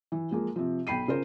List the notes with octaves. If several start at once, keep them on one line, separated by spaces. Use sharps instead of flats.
E3
F3 G#3 A#3
C3 F3
B1 G5 B5 C7 D#7
C#3 F4 A#4 C5